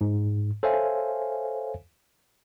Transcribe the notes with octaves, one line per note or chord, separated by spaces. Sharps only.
G#2
A4 C5 C#5 E5 F5 G#5